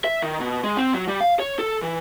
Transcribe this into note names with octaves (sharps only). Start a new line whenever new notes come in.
E5
D#3
B2
G#3
C4
F#3
G3
F5
C#5
A4
E3